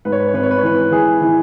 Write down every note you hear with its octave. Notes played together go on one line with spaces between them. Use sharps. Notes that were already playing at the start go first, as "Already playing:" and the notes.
G#2 B4
C#5
B4
C#5
G#1 B4
C#5
B4
C#5
E3 B4
E3 G#4
E3